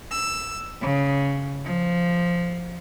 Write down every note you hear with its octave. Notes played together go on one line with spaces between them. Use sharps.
E6
C#3
F3